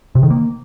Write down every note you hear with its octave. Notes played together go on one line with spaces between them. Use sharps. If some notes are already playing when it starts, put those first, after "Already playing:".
C3
D#3
A#3